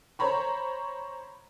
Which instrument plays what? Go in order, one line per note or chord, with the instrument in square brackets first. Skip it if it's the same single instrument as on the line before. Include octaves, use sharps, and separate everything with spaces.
[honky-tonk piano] C5 C#5 A#5 B5 C#6